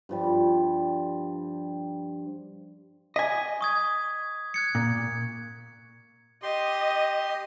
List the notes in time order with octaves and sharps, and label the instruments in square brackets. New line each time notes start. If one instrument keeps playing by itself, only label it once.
[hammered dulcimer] G2 F3 G3
[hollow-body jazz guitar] D#5 G#5 [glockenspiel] B6
[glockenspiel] C#6 D#6 G#6
F#6 G#6 C#7
[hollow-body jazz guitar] A#2
[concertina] G4 C6 [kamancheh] D#5